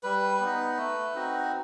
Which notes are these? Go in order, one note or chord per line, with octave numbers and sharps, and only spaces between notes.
G3 B4
B3 D#4
A3
C4 D#4 F#4